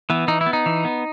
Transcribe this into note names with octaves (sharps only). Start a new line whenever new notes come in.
E3 B3
E3 D#4
E4
B3
D#4
E3
B3